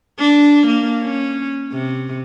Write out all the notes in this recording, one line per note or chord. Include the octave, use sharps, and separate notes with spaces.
D4
A#3
C#4
C3